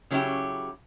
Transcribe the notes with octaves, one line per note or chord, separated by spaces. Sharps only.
C#3 F#3 C#4 E4 G4